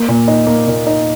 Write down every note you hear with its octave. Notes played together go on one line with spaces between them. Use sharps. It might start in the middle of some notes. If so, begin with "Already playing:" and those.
Already playing: A#3
A#2
D#4
A#3
A#2
D#4